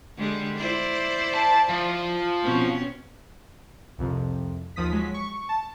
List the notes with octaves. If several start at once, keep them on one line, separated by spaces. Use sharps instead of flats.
D3 G3 G#3
E4 C5 D5
A5
F3
B2 C4 C#4
C2 F2 C3
D#2 F3 D#6 B6
F#3 G#3 B6
C#6
A5